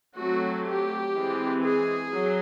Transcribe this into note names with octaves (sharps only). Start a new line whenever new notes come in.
F#3 A3 C4 F#4
G4
E3 G#3 C4
G#4
F#3